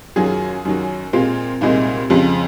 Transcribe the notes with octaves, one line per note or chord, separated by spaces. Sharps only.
F#2 D#3 F#3 F4 G#4
F#2 D#3 F#3
A#2 G#3 C4 F4
C2 A#2 G#3 C4 D#4
F2 C#3 G#3 C4 F4